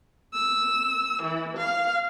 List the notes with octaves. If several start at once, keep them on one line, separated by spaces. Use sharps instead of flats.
E6
E3
F5